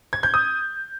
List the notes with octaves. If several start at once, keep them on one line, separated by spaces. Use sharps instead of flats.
G#6
G6
D#6